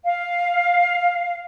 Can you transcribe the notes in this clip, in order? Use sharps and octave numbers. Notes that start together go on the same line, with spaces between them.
F5